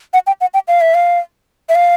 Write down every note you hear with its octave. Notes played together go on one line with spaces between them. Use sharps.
F#5
G5
F#5
G5
F5
E5
F5
E5
F5